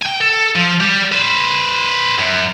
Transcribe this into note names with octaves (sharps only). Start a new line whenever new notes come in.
G5 G#5
A4
F3
G3 G4
B4 C5
F#2